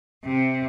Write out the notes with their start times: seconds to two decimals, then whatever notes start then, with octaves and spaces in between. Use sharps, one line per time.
0.25 C3